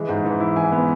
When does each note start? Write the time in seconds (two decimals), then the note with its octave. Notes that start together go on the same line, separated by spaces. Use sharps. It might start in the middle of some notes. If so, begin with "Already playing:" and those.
Already playing: E3 G#3
0.09 G#2
0.25 E3
0.40 E4
0.56 E3 G#5
0.72 B3